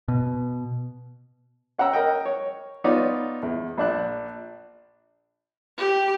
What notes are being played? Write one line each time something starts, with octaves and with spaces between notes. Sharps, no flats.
B2
C#4 F#5 G5 A#5 E6
A#4 D#5 G5
C#5
B3 D#4 F4 C#5 D5
E2
A#1 D4 F#6
G4